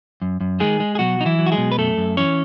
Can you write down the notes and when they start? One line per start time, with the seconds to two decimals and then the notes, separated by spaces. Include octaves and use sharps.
0.22 F#2
0.41 F#2
0.60 D#3 G#3 G#4
0.80 G#3
0.95 G#4
0.99 B2 F#3 F#4
1.19 F#3 D#4
1.26 E3 E4
1.39 F#3
1.46 F#4
1.52 G#3 G#4
1.58 B2
1.72 B4
1.78 F#2 A3 A4
1.98 F#2
2.17 E3 C#4 C#5